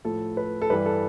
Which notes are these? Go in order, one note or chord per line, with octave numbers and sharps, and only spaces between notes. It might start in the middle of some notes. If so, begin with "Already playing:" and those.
A2 F3 A4
B4
A4
G2 E3 G3 B4
A4